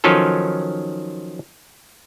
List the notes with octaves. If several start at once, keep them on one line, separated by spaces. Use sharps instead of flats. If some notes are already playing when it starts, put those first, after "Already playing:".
D#3 F3 F#3 C#4 F4 A4